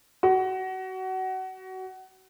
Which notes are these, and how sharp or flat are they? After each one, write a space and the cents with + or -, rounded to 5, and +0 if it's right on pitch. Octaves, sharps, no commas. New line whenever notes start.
F#4 +25